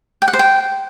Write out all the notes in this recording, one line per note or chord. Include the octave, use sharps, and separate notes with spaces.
G5
F#5
C5
G5